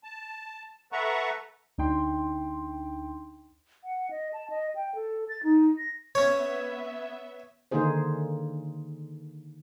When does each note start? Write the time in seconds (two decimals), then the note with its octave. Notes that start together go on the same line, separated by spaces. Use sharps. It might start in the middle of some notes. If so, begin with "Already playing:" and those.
0.04 A5
0.92 A4 B4 E5 F#5 A#5 C#6
1.78 D2 D4 D#4 G5 C6
3.84 F#5
4.11 D#5
4.33 A5
4.50 D#5
4.75 G5
4.95 A4
5.29 A6
5.43 D#4
5.78 A#6
6.15 B3 C#4 C#5 E5
7.71 D3 D#3 A#3 D#4 G#4 C5